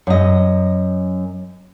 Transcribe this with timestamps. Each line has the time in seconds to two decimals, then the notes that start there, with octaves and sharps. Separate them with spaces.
0.07 F#2 D#5